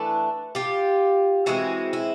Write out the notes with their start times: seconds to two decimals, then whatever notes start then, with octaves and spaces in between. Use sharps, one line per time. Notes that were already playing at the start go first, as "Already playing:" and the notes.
Already playing: E3 A3 D4 A4 B4
0.55 F4 G4
1.46 E3 G#3 C4 E4 F#4
1.93 E4